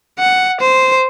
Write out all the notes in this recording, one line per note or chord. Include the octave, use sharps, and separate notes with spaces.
F#5
C5